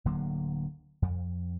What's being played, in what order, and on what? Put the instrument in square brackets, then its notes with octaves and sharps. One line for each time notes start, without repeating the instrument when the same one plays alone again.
[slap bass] D1 D3 F#3 A#3
F2